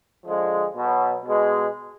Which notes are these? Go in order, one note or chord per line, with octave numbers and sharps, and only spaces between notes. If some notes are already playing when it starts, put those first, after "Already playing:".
D3 F3 G#3
B2 F#3
B2 G#3